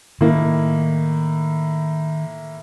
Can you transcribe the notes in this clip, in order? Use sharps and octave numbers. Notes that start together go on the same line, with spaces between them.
A2 D#3 A#3